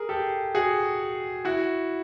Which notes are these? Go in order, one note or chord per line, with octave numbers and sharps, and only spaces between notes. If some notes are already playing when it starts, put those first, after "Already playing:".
Already playing: G#4 A#4
G4 A4
F#4 G#4
E4 F#4